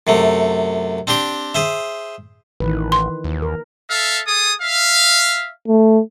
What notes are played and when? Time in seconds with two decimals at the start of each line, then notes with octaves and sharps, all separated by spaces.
0.07 F#2 C3 A3
1.07 C4 D4 G4 C6 D6
1.55 G#4 C5 E5
2.60 A1 D#3 E3 B4
2.92 C6
3.24 D#2
3.42 A#4
3.90 A4 E5 F5
4.26 G#4 A4 D#6
4.62 E5 F5
5.68 A3